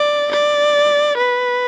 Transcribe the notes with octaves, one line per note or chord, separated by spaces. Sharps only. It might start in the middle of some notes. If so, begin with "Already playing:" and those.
Already playing: D5
D5
B4